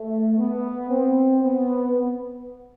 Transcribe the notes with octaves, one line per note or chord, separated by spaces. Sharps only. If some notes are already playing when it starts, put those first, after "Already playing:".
Already playing: A3
B3
C4
B3